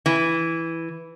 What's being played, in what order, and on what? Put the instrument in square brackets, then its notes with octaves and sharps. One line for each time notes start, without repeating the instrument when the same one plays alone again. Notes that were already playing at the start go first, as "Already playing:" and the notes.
[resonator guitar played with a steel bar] E3